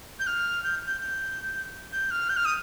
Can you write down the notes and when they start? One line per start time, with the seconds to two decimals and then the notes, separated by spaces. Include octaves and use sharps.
0.19 G6
0.27 F6
0.64 G6
0.87 G6
1.01 G6
1.92 G6
2.11 F6
2.29 G6
2.37 F6
2.45 D#6